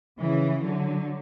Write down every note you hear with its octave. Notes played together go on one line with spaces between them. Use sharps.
C#3 E3
D3 F#3